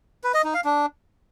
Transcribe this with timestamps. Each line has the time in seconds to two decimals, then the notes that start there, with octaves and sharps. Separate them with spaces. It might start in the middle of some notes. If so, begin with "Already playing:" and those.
0.24 B4
0.34 D#5
0.44 D#4
0.54 F5
0.65 D4